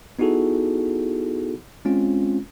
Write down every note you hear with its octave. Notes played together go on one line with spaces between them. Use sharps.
B3 D#4 E4 F#4 G#4 A4
G#3 C4 C#4 F4